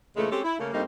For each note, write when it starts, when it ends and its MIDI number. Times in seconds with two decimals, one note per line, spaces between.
0.16 0.31 46
0.16 0.31 49
0.16 0.31 52
0.16 0.31 56
0.16 0.31 57
0.31 0.41 56
0.31 0.41 60
0.31 0.41 61
0.31 0.41 67
0.31 0.41 69
0.44 0.58 64
0.58 0.70 49
0.58 0.70 57
0.58 0.70 58
0.73 0.82 43
0.73 0.82 55
0.73 0.82 57
0.73 0.82 58
0.73 0.82 60
0.73 0.82 63